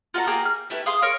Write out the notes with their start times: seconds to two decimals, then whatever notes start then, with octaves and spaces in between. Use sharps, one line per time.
0.14 F4 F#4 A4 A#5
0.27 A#3 G4 G#4 A#5
0.45 F6
0.70 A3 E4 G4 B4
0.86 G#4 F5 C6 D#6
1.02 A#4 C#5 C#6